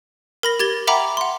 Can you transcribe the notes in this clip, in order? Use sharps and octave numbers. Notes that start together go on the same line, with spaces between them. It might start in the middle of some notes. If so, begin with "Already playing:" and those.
A#4 B5 A#6
G4 G#6 A6 G7
E5 F#5 G5 A#5 B5 D6
F#5 C6